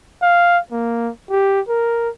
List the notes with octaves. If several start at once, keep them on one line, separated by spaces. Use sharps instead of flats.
F5
A#3
G4
A#4